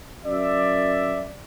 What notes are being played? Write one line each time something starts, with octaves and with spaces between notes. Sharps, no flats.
F#2 D5 E5